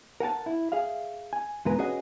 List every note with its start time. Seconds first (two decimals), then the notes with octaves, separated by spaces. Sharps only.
0.20 A#4 F#5 G#5 A5
0.46 E4
0.72 G#4 E5 F5
1.33 G#5
1.65 E2 B2 G#3 A#4 B4 A#5
1.78 C#4 F#4 G#4 B4 D#5 F#5